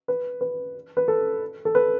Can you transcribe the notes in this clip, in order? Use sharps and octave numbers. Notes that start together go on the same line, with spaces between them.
B4
B4
B4
A4
A4
B4